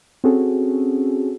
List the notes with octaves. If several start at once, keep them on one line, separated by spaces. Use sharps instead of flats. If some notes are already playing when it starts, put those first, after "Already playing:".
C4 C#4 F#4 G#4 A4